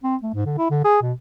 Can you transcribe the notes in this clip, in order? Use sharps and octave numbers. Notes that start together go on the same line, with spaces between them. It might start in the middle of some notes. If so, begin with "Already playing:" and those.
C4
A3
G#2
D3
E4
D3
G#4
B2